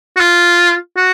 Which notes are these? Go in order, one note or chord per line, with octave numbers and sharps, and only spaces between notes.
F#4
F4
F#4